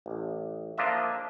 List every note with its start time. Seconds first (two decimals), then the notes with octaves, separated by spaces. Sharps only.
0.06 A1
0.78 F3 A#3 D4 F4 D#5 E5